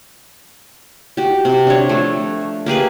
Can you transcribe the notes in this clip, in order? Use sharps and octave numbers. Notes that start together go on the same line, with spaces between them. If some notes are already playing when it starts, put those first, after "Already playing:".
F#4 G4
C3
D4 C#5
F3 A3
A#3 G4 G#4 B4